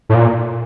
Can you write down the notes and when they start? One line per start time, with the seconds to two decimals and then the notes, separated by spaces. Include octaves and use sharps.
0.09 A2
0.14 A#2